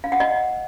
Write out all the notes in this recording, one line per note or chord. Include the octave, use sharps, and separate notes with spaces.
F5
F#5
D#5